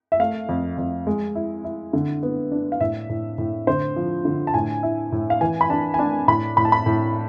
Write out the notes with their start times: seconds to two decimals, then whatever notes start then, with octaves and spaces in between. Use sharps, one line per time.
0.12 E5
0.20 A3 F5
0.49 F2
0.78 F2
1.07 G#3
1.35 E4
1.64 E4
1.93 D3
2.23 B3
2.51 D4
2.72 F5
2.80 A2 E5
3.09 A2
3.38 A2
3.67 D3 C5
3.96 F3
4.25 D3
4.47 A5
4.54 A2 G#5
4.83 E4
5.12 A2
5.30 F5
5.41 E3 G#5
5.61 B5
5.70 D4 A5
5.94 G#5
5.99 D4 A5
6.28 A2 B5
6.57 A2 B5
6.65 A5
6.72 B5
6.86 A2